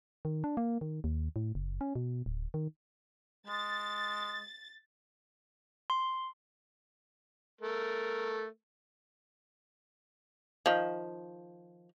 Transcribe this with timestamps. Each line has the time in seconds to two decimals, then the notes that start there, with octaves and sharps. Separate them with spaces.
0.25 D#3
0.44 D4
0.57 A#3
0.81 D#3
1.04 D#2
1.36 A2
1.55 F#1
1.81 C#4
1.96 B2
2.26 D1
2.54 D#3
3.47 G#3 A6
5.90 C6
7.61 A3 A#4
10.66 D#3 F3